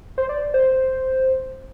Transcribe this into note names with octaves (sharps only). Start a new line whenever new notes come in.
C5
D5
C5